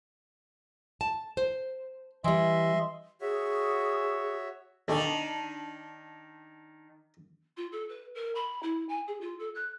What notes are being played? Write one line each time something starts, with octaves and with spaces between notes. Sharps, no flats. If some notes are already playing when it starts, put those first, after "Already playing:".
A5
C5
E3 G3 D#5 E5 C6
F#4 G#4 C#5 E5
D2 B2 D3 D#3 D4
F4
A4
B4
A#4
B5
E4
G#5
G#4
F4
A4
F#6